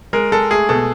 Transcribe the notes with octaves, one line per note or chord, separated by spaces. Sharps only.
G#3 A#4
G#3 A4
A3 G#4
B2 A4